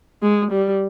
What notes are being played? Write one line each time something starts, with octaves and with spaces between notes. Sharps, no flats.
G#3
G3